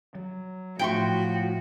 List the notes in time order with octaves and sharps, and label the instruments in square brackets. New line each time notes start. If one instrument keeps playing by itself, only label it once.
[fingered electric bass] F#3
[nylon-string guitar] A2 E4 [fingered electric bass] F3 [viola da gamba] F#4 [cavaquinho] G5 C6 C#6